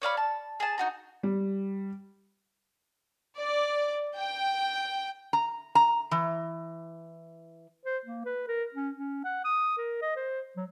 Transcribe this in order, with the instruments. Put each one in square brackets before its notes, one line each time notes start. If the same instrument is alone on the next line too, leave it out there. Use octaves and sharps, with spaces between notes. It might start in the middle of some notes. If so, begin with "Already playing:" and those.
[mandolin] C#5 D5 F5 B5
A5
G#4 A5
D#4 F#4 A#5
[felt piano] G3
[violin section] D5
G5
[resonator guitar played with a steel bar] A#5
A#5
E3
[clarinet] C5
A#3
B4
A#4
C#4
C#4
F#5
D#6
A#4
D#5
C5
F#3